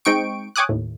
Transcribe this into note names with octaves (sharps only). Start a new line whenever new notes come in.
G#3 C4 D#4 G5 C#6 D7
C#5 G5 G#5 D6 D#6 F#6
D#2 A2